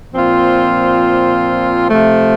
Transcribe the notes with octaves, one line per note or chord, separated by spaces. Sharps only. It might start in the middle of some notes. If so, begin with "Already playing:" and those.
A#2 F3 C4 F4
C3 F3 A3